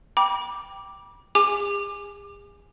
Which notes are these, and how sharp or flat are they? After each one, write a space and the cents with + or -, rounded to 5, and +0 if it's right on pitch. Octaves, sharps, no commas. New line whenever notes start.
G5 +0 B5 -40 D6 +0
G#4 -40 G#5 +0 D6 +25